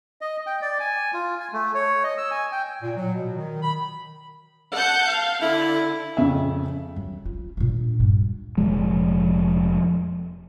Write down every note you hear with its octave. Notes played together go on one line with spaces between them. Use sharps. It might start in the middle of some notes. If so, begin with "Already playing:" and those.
D#5
G5
D5
G#5
F4
G#5
A3
C#5
D#5
E6
G#5
G5
A#2
F#3
B2
D#3
B5
F#5 A5 G6
F5
D3 E4
F2 C#3 E5
F#3
F4
A#2 D4
G2
F1 A#2 F3 G#3